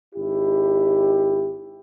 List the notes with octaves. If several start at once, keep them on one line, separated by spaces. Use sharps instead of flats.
G#1 E4 G4